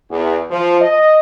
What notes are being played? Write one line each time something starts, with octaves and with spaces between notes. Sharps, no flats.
E2
F3
D#5